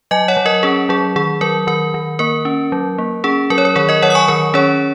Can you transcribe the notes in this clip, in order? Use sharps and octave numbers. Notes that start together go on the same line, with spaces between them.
F#3 D#5 G#5
C#5 F#5
F#3
A#4 D#5
C#4 G#4
F#3 G#4
D#3 G#4
F#3 A#4
D#3 A#4
D#3
A#3 A#4
C#4
F#3
A#3
C#4 G#4
F#3 A#4
C#5
A#4
D#3 G#4 C#5
A#4 D#5
F#3 C#5 F#5
D#6
G#5 C#6
D#3 A#4
C#4 G#4 C#5